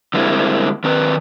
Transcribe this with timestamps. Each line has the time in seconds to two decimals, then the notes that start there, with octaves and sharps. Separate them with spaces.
0.14 D3 G3 G#3 A#3 C4 E4
0.84 D#3 C4 B4